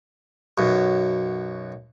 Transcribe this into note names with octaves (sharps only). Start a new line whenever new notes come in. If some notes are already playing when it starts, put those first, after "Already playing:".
B1 F#2